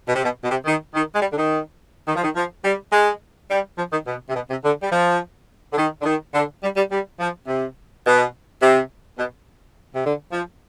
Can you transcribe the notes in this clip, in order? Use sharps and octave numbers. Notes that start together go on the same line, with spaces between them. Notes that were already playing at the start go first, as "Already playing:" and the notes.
B2
C3
B2
B2
C3
D#3
D#3
G#3
G3
D3
D#3
D#3
F3
D#3
F3
G3
G#3
G3
F3
D#3
B2
C3
B2
C3
D3
G3
F3
D3
D#3
D3
D#3
D3
G3
G3
G3
F3
C3
B2
C3
B2
C3
D3
F3